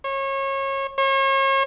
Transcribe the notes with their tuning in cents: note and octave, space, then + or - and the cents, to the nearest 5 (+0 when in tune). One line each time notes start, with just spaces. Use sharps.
C#5 -30
C#5 -40